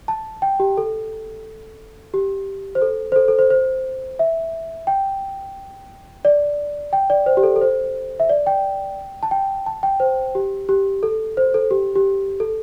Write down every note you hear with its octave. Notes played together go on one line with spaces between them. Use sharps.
A5
G5
G4
A4
G4
C5
A4
C5
A4
A4
C5
C5
E5
G5
D5
G5
D5
C5
G4
A4
A4
C5
E5
D5
G5
A5
G5
A5
G5
C5
G4
G4
A4
C5
A4
G4
G4
A4